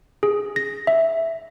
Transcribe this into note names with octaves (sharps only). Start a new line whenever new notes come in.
G#4
A#6
E5